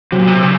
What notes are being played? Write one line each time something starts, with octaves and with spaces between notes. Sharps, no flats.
C3 F#3
A#2
C3
C#3